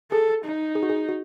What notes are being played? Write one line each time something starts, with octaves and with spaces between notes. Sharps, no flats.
G#4 A4
D#4
G#4
F#4
G#4
F#4